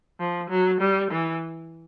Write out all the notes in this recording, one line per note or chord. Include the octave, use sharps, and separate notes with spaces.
F3
F#3
G3
E3